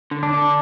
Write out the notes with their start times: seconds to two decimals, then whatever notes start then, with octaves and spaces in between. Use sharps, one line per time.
0.11 D3
0.23 D4
0.33 D3